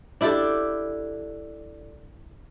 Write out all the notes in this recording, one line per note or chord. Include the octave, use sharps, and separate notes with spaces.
D4 E4 G4 A4